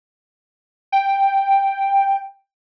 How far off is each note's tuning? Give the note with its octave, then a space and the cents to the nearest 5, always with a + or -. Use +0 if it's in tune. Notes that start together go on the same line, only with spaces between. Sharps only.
G5 +5